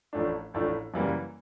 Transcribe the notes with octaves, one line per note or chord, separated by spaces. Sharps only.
A1 A2 F3 A3 D4
A1 A2 F3 A3 D4
F#2 C#3 E3 G3 A#3